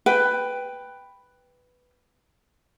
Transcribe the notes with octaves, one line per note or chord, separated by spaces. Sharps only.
B4 G5